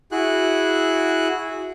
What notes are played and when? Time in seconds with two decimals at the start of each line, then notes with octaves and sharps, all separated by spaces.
0.12 E4 F#4 G#4 F#6